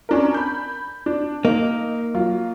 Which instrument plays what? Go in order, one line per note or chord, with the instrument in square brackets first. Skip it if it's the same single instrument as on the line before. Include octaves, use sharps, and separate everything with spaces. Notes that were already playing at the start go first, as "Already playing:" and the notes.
[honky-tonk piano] C#4 D4 A#4
B5 G6
D4
[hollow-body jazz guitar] A#3 [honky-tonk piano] D#4
[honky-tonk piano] F#3 F4